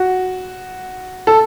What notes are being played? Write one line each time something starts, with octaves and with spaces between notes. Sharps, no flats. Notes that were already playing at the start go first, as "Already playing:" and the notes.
Already playing: F#4
A4